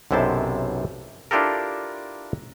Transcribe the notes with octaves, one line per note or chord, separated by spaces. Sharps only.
B1 F#2 C3 E4 C5 A5
D4 E4 F4 G4 A4 A#4